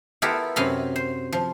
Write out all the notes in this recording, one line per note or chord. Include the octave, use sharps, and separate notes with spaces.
B3 E4 F4 G4 A4 A#4
F#2 C3 F#3 F5 B5 C6
C5
F3